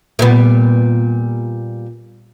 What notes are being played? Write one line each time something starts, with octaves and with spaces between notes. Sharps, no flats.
A#2 G3 B3